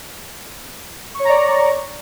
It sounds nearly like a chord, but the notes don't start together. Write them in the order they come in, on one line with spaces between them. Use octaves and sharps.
C#6 C#5 A#5 D5